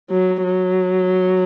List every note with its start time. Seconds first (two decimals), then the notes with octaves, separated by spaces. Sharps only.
0.10 F#3
0.44 F#3